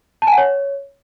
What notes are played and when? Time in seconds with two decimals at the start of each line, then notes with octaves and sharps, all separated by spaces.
0.22 A5
0.27 G#5
0.33 F#5
0.38 C#5